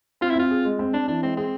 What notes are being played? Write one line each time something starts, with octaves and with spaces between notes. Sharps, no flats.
C4 F4
E4
C4 F4
G#4
G#3
C4
C4 D4
E3 D4
G#3 C4
C4 G#4